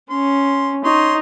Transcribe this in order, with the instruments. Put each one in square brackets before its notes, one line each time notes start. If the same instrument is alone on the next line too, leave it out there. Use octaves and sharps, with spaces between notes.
[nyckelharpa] C#4 [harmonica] C6
[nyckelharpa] D#4 [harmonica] C#5 C6